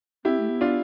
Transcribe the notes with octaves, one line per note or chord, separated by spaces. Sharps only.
C4 E4 G4
A3
B3
D4 F4